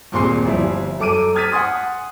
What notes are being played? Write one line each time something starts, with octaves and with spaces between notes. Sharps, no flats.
D#2 A#2 C4 G#4 C6 C7
G1 F3 G3 E4
F#2 A4 D6 D7 D#7
D#6 F6 G#6 A6 B6 D#7
F#5 G#5 C6 D#6